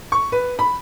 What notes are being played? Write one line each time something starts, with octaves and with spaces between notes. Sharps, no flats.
C#6
B4
B5